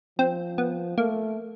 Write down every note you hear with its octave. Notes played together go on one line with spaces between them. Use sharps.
F3 C4
B3
A3 A#3